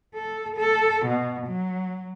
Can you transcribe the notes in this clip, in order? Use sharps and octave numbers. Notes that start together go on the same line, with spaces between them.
A4
A4
B2
F#3